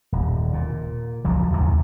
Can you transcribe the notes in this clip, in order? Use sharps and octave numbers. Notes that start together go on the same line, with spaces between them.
D#1
A#2
C#2 F3 F#3
D#2 G#2 C3 D#3